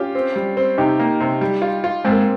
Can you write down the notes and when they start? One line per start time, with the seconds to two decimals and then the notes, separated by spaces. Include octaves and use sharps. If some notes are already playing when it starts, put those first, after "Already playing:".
Already playing: C#4 F4 G4
0.15 C4
0.36 G3
0.57 C4
0.78 C3 D#4 G4
0.99 A#3
1.20 C3
1.41 G3
1.62 F4
1.84 F4
2.05 G#2 C4
2.12 A#3